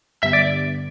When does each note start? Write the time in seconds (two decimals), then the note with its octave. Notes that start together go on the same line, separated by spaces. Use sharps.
0.23 G2 D3 G3 B3 E5
0.33 D5